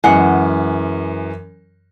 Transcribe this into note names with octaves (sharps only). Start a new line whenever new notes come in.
F#2 E3 G#3 F#5